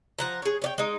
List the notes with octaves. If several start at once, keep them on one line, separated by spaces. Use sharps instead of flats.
F3 F#5 A#5
G#4 C#5
C#5 D5 G5
G#3 D#4